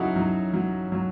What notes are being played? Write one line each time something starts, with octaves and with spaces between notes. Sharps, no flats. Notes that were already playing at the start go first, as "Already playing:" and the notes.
Already playing: C#3 F#3 D#4 E4 F#4 A4
F#3
F#3
F#3